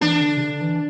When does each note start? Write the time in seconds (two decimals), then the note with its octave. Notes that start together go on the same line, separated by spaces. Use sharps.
0.01 E3 D4
0.21 D3
0.37 C3
0.42 D3
0.61 E3